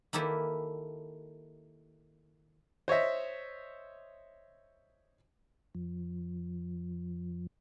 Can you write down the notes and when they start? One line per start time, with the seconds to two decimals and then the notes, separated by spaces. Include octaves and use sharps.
0.13 D#3 A#3 E4 G4 A4 B4
2.88 C5 C#5 D#5 E5
5.75 F2 F3